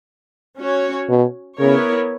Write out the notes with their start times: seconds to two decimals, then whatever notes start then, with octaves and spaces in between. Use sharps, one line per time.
0.59 C#4 F#4 C#5
1.09 B2
1.58 C#3 B3 E4 A#4 C#5